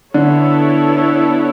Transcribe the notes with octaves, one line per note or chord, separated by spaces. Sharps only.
D3 B3 E4 A4 C#5